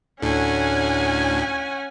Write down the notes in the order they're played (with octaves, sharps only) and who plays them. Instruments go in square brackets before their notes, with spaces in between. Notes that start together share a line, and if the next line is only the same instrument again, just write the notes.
[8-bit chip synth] D2 A2 D3 [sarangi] C#4 [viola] F#5 G#5